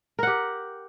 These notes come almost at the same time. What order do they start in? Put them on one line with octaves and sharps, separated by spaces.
A#4 F#5 G4